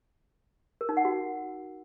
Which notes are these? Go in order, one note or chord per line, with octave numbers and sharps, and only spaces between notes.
A#4
D#4
F#5
F#4